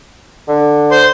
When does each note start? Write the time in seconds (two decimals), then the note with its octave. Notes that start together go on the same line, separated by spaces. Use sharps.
0.48 D3
0.91 C5 C6